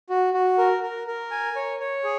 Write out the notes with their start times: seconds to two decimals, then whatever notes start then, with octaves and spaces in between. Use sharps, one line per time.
0.10 F#4
0.34 F#4
0.58 A#4
0.83 A#4
1.07 A#4
1.31 G#5
1.56 C#5
1.80 C#5
2.04 G#4